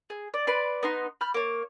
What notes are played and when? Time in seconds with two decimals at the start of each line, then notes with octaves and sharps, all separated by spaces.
0.10 G#4
0.34 D5
0.47 B4 D5 C6
0.83 B3 D#4 C6
1.21 B5 F6 G6
1.34 A#3 C#5